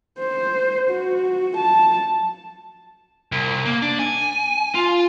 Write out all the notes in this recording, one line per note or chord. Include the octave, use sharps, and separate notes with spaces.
C5
F#4
A5
C2
A#3
D4
G#5
F4